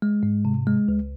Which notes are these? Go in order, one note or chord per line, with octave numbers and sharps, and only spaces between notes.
G#3
G#2
C3
G#3
C#2